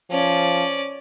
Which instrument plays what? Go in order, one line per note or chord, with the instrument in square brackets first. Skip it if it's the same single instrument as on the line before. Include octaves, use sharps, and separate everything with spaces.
[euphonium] F3 [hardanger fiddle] C#4 D5